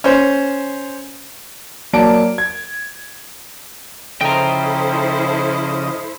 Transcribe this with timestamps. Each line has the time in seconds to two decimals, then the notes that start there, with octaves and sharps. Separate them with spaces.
0.04 C#4 C5
1.93 F#3 A#3 D5 A5 D7
2.38 G#6
4.21 C#3 F3 E4 A4 C5 D#5 G5 A#5